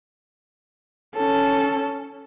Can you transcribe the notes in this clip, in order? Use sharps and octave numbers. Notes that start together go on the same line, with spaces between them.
C#4 A4